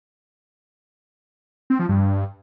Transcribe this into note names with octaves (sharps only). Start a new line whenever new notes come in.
C4
F3
G2